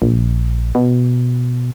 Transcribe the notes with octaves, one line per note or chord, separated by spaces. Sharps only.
A#1
B2